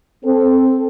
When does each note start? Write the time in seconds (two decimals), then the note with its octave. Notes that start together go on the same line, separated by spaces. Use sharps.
0.25 C4 A4